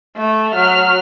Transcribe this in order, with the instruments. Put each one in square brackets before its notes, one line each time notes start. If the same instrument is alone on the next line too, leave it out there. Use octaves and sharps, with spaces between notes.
[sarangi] A3
[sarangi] F#3 [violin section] F6